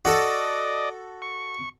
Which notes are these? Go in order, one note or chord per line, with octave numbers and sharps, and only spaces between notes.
F#4 A4 D5 D#5
C#6